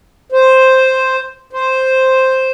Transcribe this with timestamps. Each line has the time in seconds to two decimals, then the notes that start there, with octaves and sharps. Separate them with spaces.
0.32 C5
1.53 C5